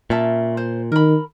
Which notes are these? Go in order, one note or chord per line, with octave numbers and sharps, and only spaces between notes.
A#2 C#4 E5 A5
C5
D#3 A#4 B5